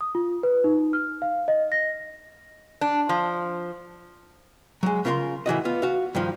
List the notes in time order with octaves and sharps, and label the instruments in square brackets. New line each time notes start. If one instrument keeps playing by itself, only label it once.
[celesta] D#6
F4
B4
D#4
F6
F5
D#5
A#6
[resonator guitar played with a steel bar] D4
F3
[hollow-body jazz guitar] F#3 G#3
C#3 F4 A#4 F#5 C6
A2 E3 F#4 D#5
B3 F4
F#4 F5
G2 D#3 F3